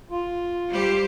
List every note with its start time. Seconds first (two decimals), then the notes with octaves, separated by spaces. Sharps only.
0.10 F4
0.70 G3 G4 C5